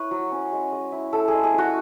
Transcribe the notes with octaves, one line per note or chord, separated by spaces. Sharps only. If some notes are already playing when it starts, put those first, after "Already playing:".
Already playing: E4 B4 C#5
F#3
C#4
G#3
G#3
E4
E4 A4
G#3 G#4
G#4
C#4
F#4